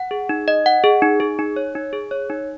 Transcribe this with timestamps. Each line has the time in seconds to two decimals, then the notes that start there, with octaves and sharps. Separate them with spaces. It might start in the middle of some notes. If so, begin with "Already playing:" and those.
Already playing: F#5
0.11 G#4
0.29 D#4
0.48 D#5
0.66 F#5
0.84 G#4
1.02 D#4
1.20 G#4
1.39 D#4
1.56 C#5
1.75 D#4
1.93 G#4
2.11 C#5
2.30 D#4